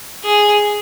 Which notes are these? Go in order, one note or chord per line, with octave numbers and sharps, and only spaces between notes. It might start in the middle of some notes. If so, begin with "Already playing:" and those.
G#4